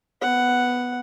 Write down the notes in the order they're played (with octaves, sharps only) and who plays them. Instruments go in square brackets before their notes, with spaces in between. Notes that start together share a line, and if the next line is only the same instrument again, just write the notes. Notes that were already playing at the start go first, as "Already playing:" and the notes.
[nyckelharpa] B3 F#5